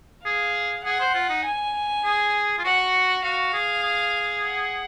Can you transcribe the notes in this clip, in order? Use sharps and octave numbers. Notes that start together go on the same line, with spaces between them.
G#4 F5
G#4 F#5
C5
F4
D#4
G#5
G#4
F4
F#4 F#5
F#4 F5
G#4
G#4
F#5